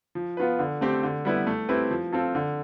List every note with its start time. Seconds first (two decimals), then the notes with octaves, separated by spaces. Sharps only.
0.15 F3
0.37 B3 F4 B4
0.59 D3
0.81 A3 C4 G4
1.03 D3
1.25 G3 B3 E4 B4
1.47 A3
1.69 C4 E4 G4 B4
1.91 F3
2.13 C4 F4 A4
2.35 D3